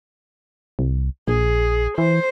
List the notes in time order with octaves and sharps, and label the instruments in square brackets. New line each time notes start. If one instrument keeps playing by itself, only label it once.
[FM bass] C2
[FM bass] A#1 [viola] G#4
[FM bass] E3 [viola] C5